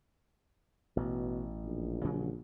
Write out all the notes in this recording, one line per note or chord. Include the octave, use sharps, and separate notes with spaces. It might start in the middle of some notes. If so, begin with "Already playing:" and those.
A1 B2
A#1
C#3 F#3 G3